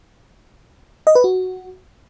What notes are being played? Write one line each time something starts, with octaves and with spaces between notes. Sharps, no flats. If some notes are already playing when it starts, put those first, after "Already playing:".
D#5
B4
F#4